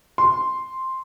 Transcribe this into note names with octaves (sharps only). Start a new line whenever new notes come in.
C6